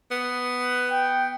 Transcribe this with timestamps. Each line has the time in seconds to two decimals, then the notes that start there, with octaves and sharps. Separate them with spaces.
0.11 B3
0.91 G5